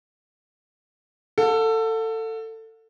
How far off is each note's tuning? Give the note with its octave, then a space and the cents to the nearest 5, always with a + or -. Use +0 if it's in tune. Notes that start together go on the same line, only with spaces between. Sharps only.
A4 +20 F#5 -45